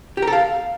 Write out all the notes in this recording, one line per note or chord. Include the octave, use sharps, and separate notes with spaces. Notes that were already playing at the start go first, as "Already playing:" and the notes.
G4
A#4
A4
F5